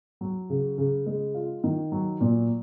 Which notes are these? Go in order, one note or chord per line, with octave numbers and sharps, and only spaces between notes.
F#3
C#3
C#3
G#3
F4
D#3
F#3
A#2